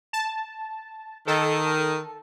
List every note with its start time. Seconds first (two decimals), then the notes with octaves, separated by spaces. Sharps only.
0.13 A5
1.27 D#3 A4